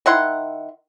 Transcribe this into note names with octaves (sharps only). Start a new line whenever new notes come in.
D#3 E4 F#5 C6